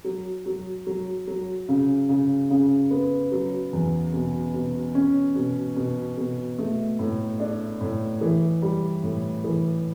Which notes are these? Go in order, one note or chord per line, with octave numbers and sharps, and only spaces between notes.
F#3
F#3
F#3
F#3
C#3
C#3
C#3
B3
F#3
E2
B2
B2
C#4
B2
B2
B2
A3
A2
D4
A2
E3
G3
A2
E3